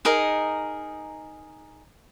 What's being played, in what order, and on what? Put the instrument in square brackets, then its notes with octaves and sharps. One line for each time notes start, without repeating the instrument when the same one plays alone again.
[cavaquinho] D#4 G#4 A#4 D#5